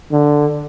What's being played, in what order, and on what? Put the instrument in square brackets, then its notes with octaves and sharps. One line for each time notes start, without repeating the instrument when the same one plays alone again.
[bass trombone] D3